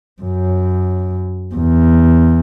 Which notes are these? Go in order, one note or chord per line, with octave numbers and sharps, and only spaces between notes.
F#2
E2